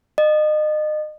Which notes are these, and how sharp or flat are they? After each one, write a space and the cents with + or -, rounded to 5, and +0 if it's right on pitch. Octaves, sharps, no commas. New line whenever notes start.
D#5 -30